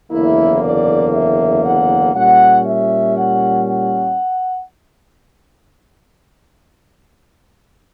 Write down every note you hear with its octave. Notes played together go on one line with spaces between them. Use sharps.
F#1 E2 D3 A#3 E4
D5
E5
F#5
A#2 G3 C#4 F#5
E5
F#5
F#5